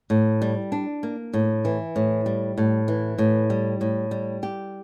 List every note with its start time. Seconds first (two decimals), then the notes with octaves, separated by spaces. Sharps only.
0.10 A2
0.42 G3
0.72 D4
1.03 A#3
1.34 A2
1.65 E3
1.96 A2
2.26 G3
2.58 A2
2.88 E3
3.18 A2
3.50 G3
3.81 A2
4.11 G3
4.43 G4